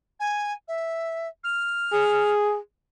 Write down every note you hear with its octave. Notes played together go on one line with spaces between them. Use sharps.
G#5
E5
F6
G#4